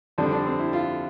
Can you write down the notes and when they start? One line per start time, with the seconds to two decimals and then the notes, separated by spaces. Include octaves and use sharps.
0.18 F2 D3 G3 C4 D4
0.31 D4
0.46 C4
0.59 E4
0.73 F4